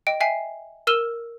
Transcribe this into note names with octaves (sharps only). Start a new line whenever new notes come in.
D#5 G5 D7
E5 G5 G#5 C7
A#4 E6 F6 D#7 E7 G7